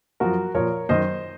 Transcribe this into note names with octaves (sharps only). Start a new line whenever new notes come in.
F#2 F3 F#4 A#4
A#2 F3 A#4 C#5
F#2 D#3 C5 D#5